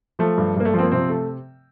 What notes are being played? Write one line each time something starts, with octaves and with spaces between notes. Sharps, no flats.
F3 A3
G2
G2 A#3
A3
F3 C4
A#3
C3 C4
A3